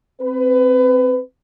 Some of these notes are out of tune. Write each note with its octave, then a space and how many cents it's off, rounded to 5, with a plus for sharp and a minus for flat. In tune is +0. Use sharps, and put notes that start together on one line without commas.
C4 +0 B4 +30